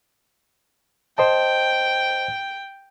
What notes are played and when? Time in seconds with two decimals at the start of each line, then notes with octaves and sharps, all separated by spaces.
1.18 C5 D#5 G5 A5